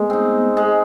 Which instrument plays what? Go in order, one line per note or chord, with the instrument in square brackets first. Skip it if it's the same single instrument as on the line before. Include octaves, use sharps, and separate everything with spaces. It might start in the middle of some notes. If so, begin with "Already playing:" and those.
Already playing: [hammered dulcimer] G#3 [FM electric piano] A3 B3
[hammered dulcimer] C4 D#4
G#3